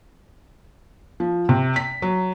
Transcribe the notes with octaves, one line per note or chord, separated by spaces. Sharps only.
F3
C3
B6
F#3